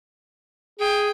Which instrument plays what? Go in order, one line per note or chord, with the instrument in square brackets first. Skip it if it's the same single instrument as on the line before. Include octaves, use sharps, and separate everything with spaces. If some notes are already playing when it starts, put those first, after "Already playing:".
[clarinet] G#4 [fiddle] G5